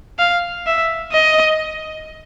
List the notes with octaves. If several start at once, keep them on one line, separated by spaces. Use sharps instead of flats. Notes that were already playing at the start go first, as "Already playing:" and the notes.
F5
E5
D#5